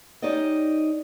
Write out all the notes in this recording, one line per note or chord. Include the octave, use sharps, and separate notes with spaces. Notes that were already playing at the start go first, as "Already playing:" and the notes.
C#4 D#4 G4 D5 D#5